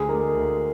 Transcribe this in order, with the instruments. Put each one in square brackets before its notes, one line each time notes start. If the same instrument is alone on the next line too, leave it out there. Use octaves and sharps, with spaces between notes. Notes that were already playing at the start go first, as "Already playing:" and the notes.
Already playing: [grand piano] D2 [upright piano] G#4
[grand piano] D3 G#3 [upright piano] A#4
[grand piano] D2